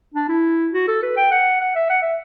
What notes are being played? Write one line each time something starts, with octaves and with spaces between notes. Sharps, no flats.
D4
E4
F#4
A4
B4
G5
F#5
F#5
E5
F#5
E5